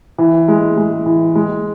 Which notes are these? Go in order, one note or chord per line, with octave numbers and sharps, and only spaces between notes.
E3
G#3
G#3
E3
G#3